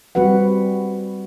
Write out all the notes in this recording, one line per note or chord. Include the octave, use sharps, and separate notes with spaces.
G3 C4 F#4 B4 F#5